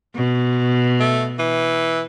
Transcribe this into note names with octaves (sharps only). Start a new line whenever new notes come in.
B2
A3
E3